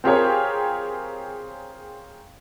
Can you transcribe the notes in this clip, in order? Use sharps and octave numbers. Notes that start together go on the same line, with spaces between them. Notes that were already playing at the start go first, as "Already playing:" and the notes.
C4 F4 G4 G#4 A#4 C#5